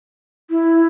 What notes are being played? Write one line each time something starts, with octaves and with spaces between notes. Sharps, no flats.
E4